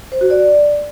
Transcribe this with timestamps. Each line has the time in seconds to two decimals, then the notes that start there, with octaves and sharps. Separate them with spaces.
0.12 C5
0.21 F#4
0.30 D5